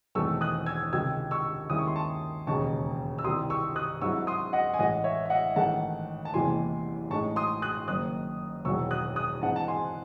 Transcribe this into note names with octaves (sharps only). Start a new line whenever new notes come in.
E1 E2 D#3 A3 C4 C#6 E6
D#6 F#6
E6 G#6
C#2 C3 D#3 E6 G#6
C#6 E6
D#2 D#3 G#3 C#4 E4 D#6
C#6
C6
A5 C#6
E1 D#2 C#3 G#3 D#4 A5 C#6
E6
C2 C3 D#3 C6 D#6
C#6 E6
D#6 F#6
G#2 F#3 C4 E4 C#6 E6
C6 D#6
D#5 F#5
G#5
A1 A2 E3 G#3 D#5 F#5
C#5 E5
E5
D#5 F#5
A1 G#2 D#3 A3 F#5 A5
A5
F#1 E2 C3 E3 G#3 G#5 C6
A1 A2 G#3 D#4 A5 C#6
C6 D#6
D#6 F#6
F#1 F#2 D#3 D#6 F#6
E1 E2 D#3 F#3 C#6 E6
D#6 F#6
D#6 F#6
G#2 E3 C4 D#4 F#5 A5
A5
G#5 C6